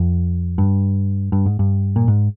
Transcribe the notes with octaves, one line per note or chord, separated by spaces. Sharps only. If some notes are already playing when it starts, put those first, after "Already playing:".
Already playing: F2
G2
G2
G#2
G2
A#2
G#2